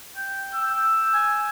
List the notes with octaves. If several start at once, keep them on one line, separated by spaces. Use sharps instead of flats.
G5
E6
G#5